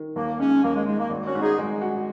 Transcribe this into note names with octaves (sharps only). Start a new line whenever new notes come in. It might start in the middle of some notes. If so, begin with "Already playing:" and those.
Already playing: D#3
D#2 A#3
G#3 C#4 D#4
D#2 A#3
G#3
G#3 D#4
A#3
G#1
C#4 F#4
G#2
D#4 G#4
G#3
F#4